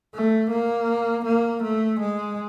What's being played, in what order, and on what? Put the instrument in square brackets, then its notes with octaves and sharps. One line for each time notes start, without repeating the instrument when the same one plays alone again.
[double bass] A3
A#3
A#3
A3
G#3